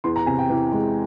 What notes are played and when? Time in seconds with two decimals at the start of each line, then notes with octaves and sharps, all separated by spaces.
0.04 E2 C6
0.16 A#5
0.26 C3 G#5
0.38 G5
0.49 E3
0.72 G#3